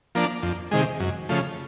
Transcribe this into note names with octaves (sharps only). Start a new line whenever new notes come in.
F3 A#3 D4
F2
C3 D#3 G#3
F#2
C#3 F3 A3